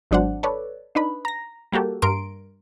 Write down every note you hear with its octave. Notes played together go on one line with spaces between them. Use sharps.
G#1 F#3 D4 C5 F#5
A4 B4 C#5 D5
D4 D#4 B4 B5
A#5 A#6
G3 A#3 F#4 G4 A4
G2 A#4 C6 D7